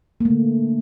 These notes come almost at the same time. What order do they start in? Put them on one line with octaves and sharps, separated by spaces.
A#3 A3 D3